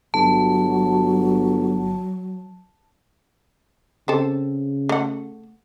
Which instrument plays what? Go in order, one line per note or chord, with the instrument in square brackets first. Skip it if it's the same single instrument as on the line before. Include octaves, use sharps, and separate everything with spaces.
[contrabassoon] G1 [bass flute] F#3 [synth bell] A5
[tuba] C#3 [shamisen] C4 A4
[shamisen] A3 F#5